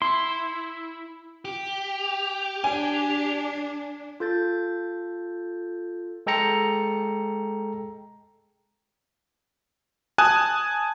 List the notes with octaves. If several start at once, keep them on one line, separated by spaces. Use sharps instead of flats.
E4 C6
G4
D4 G#5
F4 A4 G6 A6
G#3 A4 G5 A#5 C#7
G#5 A5 D#6 F#6 G#6